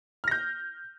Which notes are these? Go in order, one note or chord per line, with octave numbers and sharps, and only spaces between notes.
F6 G6 A#6